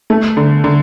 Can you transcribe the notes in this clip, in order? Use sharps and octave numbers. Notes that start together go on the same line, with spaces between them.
A3
D3
D3